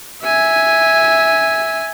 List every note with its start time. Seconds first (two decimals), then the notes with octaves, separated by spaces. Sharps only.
0.23 E5 G#5